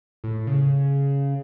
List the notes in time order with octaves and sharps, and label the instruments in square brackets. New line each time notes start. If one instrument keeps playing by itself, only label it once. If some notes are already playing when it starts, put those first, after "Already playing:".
[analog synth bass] A2
C#3